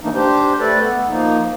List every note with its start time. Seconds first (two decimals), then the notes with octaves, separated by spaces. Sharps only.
0.01 E3 A3 A#3 D4 D#4
0.15 D4 G4 C5
0.60 A3 A4 B4 D5
0.81 B3
1.08 F3 A#3 D#4